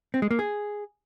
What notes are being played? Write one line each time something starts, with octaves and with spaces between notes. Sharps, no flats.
C4
G#3
A#3
G#4